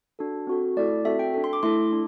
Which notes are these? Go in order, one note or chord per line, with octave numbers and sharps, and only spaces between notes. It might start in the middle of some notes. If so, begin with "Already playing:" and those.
D4 F#4 A4
C4 F#4 A4
A3 E4 A4 D5
C4 F#4 A4 E5
G5
D4 A4
C6
D6
A3 E4 A4 C6
D4